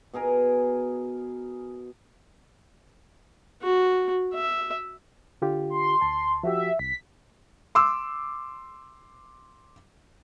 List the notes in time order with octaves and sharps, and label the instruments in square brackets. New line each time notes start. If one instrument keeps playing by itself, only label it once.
[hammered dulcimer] B2 G#4 A#4 G#5
[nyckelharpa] F#4
E5
[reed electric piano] D3 F4 G4
[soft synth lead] C6
[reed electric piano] D2 A5
[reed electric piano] F3 F#4 G4 [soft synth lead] E5
[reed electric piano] C2 [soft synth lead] B6
[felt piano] C6 D6 E6